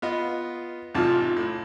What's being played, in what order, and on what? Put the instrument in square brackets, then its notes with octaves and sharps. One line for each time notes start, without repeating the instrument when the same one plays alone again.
[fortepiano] B3 F4 D#5
[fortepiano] A1 C3 A5 [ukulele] D#4 F4
[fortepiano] A2